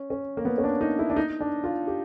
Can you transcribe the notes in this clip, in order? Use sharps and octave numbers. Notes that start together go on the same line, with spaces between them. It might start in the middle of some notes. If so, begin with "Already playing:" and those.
Already playing: C#4
C#4
A#3
B3
C#4
D4
D#4
E4
D4
D#4
D4
F4
G4